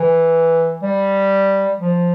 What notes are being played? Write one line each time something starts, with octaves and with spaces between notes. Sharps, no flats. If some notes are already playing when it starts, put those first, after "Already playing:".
Already playing: E3
G3
F3